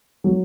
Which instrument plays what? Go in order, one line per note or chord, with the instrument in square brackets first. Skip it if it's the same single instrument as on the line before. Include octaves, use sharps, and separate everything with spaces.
[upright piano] F#3